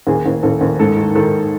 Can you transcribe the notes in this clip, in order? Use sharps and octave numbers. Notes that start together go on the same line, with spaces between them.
D#2 G#4
D#2
D#2 A4
D#2
G#2 A4
D#3
D#3 A4